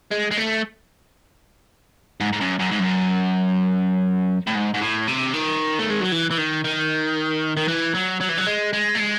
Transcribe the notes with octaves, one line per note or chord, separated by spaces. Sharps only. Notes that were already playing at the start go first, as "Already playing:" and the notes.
G#3
G#3
A3
G#2
G#2
F#2
F#2
G#2
F#2
A2
G#2
G#2
A2
C3
D#3
A3
G#3
F#3
E3
E3
D#3
D#3
D#3
E3
F#3
F#3
E3
F#3
G#3
G#3
A3
G#3